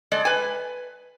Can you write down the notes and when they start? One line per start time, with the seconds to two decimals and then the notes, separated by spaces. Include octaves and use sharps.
0.12 G#3 A4 D5
0.25 B4 G#5